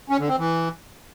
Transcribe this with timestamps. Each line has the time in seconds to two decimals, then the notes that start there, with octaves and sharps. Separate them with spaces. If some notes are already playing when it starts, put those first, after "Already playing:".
0.10 C#4
0.19 D3
0.29 C4
0.38 E3